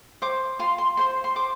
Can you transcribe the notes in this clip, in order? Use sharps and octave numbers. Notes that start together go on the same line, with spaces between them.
C5 D6
F4 C6
C6
C5 C6
C6
C5 D6